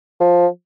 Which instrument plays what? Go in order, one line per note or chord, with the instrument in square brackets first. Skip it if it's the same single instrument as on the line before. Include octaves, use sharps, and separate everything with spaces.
[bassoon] F3